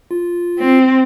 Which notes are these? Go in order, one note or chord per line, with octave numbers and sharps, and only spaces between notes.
F4
C4